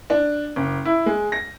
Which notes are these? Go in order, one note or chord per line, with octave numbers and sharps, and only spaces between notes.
D4
F#1
E4
G#3
A#6